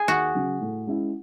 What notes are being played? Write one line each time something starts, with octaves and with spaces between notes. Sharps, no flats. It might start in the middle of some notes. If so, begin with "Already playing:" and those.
Already playing: G#4
D#2 F#4
C#3 F#3
A2
G#3 C#4 E4